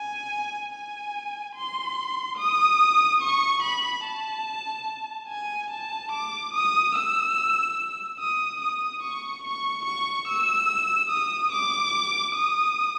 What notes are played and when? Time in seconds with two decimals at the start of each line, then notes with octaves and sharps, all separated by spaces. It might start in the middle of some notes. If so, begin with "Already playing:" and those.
Already playing: G#5
0.72 G#5
1.56 C6
2.37 D#6
3.21 C#6
3.63 B5
4.04 A5
5.29 G#5
5.71 A5
6.12 D6
6.54 D#6
6.95 E6
8.20 D#6
8.61 D#6
9.03 C#6
9.44 C#6
9.85 C#6
10.28 E6
11.10 D#6
11.52 D6
12.35 D#6